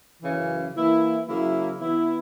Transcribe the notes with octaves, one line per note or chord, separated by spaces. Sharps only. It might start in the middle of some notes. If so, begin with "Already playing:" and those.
F#2 C#3 E3
E3 A#3 E4
C#3 F#3 A#3 E4
E3 B3 E4